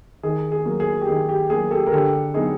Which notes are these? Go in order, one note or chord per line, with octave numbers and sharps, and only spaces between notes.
D#3 G#4
G#4
F#3 A#3
G#4
G4
D#3 G#4
G4
F#3 A#3 G#4
G4 A4
A#4
D3 G4 A4
F#3 B3 D#4 G#4